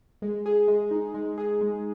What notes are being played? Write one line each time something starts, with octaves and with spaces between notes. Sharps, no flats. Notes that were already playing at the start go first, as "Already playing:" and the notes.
G#3
G#4
G#3
D#4
G#3
G#4
G#3